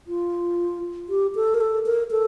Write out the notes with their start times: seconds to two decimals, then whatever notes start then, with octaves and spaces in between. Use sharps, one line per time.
0.07 F4
1.09 G4
1.35 A4
1.54 A#4
1.61 A4
1.86 A#4
2.11 A4